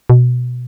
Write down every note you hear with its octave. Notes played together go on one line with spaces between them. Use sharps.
B2